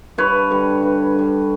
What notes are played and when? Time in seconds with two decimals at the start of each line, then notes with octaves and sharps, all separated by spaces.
0.18 G2 B4 C#5
0.50 D3 G3
0.82 G2
1.15 D3 G3